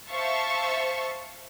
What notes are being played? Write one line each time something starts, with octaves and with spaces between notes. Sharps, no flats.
C5 E5 F5 A5 C#6